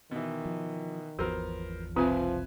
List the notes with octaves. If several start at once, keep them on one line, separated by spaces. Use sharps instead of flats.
B2 D#3 E3
F3
G#1 E2 F3 B3 F#4 A#4 C5
F#1 C2 F3 C4 F4 B4 E5 G#5